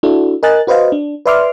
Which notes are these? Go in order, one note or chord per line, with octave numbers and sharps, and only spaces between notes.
D4 E4 F#4 A4
A#4 D#5 G#5 F#6 A6
F#4 B4 C5 D#5 F5
D4
B4 D5 E5 C6 D6 F6